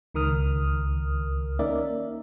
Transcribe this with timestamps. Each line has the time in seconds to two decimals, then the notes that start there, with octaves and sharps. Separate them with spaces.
0.14 C#2 D#3 A#4 D#6 F6
1.59 A#3 C#4 D#4 A#4 D5 E5